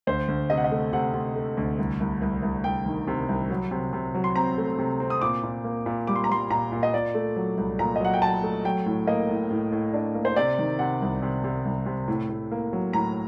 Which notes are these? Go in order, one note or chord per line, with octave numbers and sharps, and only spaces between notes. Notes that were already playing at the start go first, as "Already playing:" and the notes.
D2 C5
D2
C3 D#5
F#5
D#5
A3
C3 F#5
C3
A3
D2
C2
C2
C2
C2
C2 G5
D#3
C3
C2
F#3
C3
C3
F#3
C6
C4 A#5
A3
C3
C4
D#6
A#2 D6
A#2
A#3
A#2
G3 D6
C6
A#5
G3 C6
A#2 A#5
A#2
D#5
A#2 D5
A3
F#3
C2
A#2 A#5
D#5
F#3 F#5
G5
F#3 A5
A3
F#3 G5
A2
A#3 D#5
A2
A2
A2
D4
A#3
C5
C3 D5
D#3
C3 F#5
C2
C3
C3
C2
C3
A2
A2
A#3
F#3
A2 A#5